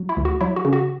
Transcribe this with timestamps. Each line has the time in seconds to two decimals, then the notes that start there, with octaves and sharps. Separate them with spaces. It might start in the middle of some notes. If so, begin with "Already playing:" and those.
Already playing: F#3
0.09 E4
0.17 D2
0.25 F#4
0.41 F#3 E4
0.56 F#4
0.65 C#3
0.73 F#4